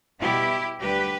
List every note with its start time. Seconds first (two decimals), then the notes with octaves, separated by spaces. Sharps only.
0.21 B2 G3 B3 E4 G4
0.81 D2 D3 G3 G4 B4